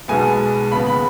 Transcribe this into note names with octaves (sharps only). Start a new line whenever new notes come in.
B1 B2 G#3 B3 G#5
D#2 C#3 B3 B5
B5